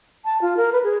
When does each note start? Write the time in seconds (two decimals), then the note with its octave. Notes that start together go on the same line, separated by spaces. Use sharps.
0.25 A5
0.42 F4
0.57 A#4
0.73 B4
0.84 G#4